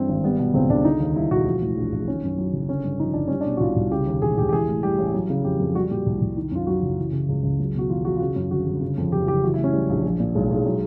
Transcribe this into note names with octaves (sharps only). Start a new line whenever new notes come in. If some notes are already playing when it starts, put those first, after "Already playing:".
Already playing: G2 E3 C4
G#1
G3 B3
B2
C#2 C4
C#2 D4
D3 D#4
D#2
G3 E4
E1 F#4
F3
A2
A#1
A#1
D#3 C#4
F#2
F#3
F#1
D3 C#4
G2
F3 D#4
G1 D4
G3 C#4
D4
B2
F#4
C2 F4
C2
C#3 G4
D#2
E1 G#4
E1 G4
G4
E3 G#4
A2
G3 G4
A1
F#3
C#3
F2 G4
F2
G3 F#4
A#2 G4
C2
C2
D#3
F#2 F4
F#3 F#4
F#1
E3
C#3
C#2
C#2
F#3
B2 F#4
E2 F4
E2 F#4
F4
C#3 F#4
F#2
G1 F#4
G1
C#3
F2
F#1 G4
F#1 G4
E3 F#4
E4
A2
C#4
G3
A#1
F3
A#2
B1 G#3
B1
G#3
F#3